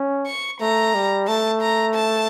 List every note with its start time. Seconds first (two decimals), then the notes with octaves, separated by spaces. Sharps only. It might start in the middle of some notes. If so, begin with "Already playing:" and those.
Already playing: C#4
0.27 C#6
0.61 A3 A#5
0.95 G3
1.28 A3 A5
1.62 A#5
1.95 A5